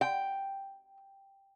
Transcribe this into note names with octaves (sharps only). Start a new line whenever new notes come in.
G5